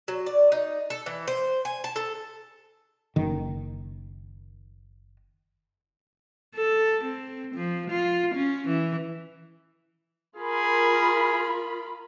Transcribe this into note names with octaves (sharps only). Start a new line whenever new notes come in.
F#3
D5
D#4
A4
E3
C5
G#5
A5
A4
F#1 D#3
A4
C4
F3
F4
C#4
E3
F4 G#4 A#4 B5